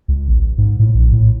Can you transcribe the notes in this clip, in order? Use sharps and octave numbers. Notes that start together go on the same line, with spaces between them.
C#2
A1
G#2
A2
A#1
A2